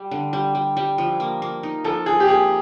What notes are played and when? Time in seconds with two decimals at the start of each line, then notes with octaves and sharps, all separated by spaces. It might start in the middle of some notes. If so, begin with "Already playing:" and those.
Already playing: G3
0.11 D3
0.33 G3
0.55 G3
0.77 G3
0.98 F3
1.20 A#3
1.42 A#3
1.63 D#4
1.84 F3 A4
2.06 F3 G#4
2.20 G4
2.28 A#3 G#4